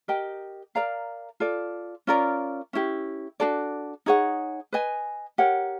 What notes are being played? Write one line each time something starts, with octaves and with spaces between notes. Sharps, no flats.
G4 A#4 D#5 G5
A#4 D5 F5 A#5
F4 A4 D5
C#4 F4 A#4 D5
C#4 E4 G4
D4 F#4 A4 D5
D#4 G#4 C#5 F#5
B4 D#5 G#5
G4 A#4 C#5 F#5